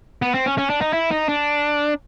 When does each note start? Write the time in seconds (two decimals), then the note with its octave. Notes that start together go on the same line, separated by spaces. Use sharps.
0.22 B3
0.34 C4
0.46 C#4
0.58 C#4
0.70 D4
0.81 D#4
0.93 E4
1.11 D#4
1.29 D4